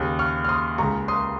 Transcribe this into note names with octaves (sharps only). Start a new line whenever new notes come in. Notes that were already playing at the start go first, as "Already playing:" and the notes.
Already playing: D#2 C#3 D#6 F#6
C#6 F6
F6
C6 D#6
C#2 C#3 A#5 C#6
C6 D#6